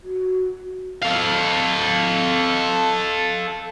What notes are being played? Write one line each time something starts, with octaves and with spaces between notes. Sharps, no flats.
F#4
A4 F5